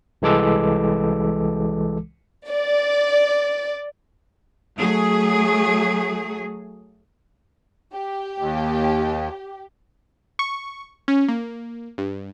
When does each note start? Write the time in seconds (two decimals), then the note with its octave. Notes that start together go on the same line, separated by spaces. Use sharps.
0.22 C2 E3 G#3 A4 D6 E6
2.48 D5
4.77 F#3 A3 G#4
7.92 G4
8.38 D#2
10.39 C#6
11.08 C#4
11.28 A#3
11.98 G2